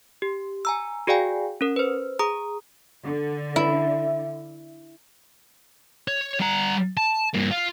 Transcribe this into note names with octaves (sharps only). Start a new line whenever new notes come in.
G4
G#5 A#5 E6
F#4 G#4 D5 F5 G5 G#5
C#4 A#4
B4 C5
G#4 A#5 D#6
D3
E4
C#5
G3 A#5
A5
G2 A#3
F4